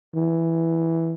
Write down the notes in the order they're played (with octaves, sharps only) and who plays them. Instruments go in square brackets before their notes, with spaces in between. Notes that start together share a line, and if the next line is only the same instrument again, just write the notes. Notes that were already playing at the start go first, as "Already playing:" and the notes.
[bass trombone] E3